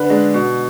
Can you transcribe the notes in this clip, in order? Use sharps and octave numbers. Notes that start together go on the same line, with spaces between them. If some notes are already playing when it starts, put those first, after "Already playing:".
Already playing: D3 B4
G#3 D4
B2